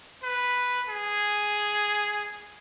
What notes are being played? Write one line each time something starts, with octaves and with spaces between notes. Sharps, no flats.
B4
G#4